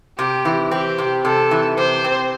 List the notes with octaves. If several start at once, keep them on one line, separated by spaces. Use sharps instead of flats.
C3 G4
E3
C4 G4
C3
C3 A4
E3
C3 C5
C4